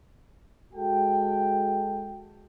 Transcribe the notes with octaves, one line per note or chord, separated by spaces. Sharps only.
G#3 F#4 A4 G5